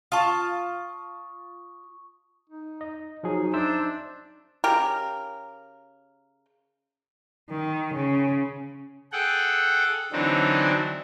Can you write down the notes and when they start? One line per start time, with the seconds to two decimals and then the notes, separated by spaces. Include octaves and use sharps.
0.12 F4 A5 C#6 D#6
2.50 D#4
2.81 D#5
3.23 F3 F#3 D#4 G#4
3.54 D4 C5 E5 E6
4.64 C#3 G4 A#4
7.50 D#3
7.94 C#3
9.12 G#4 A4 F#5 G5
10.12 D3 E3 F#3 C4 D4 D#4